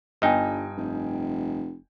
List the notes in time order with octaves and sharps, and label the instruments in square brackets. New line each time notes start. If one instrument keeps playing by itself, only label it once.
[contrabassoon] G1 [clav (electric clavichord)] G2 D#4 [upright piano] D#5 G5 G#5
[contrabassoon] F1